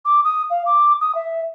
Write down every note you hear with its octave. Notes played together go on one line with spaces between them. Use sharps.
D6
D#6
F5
D6
D#6
E5